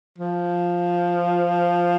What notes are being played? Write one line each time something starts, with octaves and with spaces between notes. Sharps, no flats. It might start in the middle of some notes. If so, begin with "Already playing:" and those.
F3